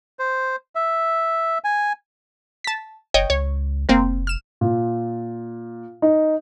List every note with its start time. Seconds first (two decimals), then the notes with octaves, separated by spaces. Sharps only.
0.19 C5
0.75 E5
1.64 G#5
2.64 A5 B6
3.14 F#1 C#5 D#5 G5
3.30 C#2 C#5
3.89 F1 A#3 C4 A#4
4.27 F6 E7
4.61 A#2
6.02 D#4